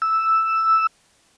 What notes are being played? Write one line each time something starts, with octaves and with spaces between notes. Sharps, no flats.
E6